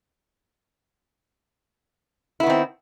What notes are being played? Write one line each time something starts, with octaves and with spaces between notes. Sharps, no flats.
D#3 B3 C4 E4